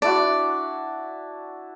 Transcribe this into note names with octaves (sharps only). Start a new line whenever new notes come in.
D4 E4 F#4 D5